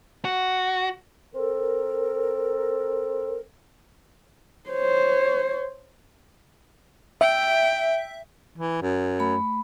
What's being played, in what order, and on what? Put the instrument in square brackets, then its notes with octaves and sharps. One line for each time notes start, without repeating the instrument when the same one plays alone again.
[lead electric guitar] F#4
[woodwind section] C4 A4 A#4
[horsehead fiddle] C5 C#5
[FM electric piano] E5 [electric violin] G5
[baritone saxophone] E3
F#2
[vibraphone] A3 B5